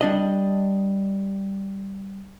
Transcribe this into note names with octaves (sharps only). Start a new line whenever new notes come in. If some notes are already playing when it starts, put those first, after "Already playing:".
G3 D4 D#5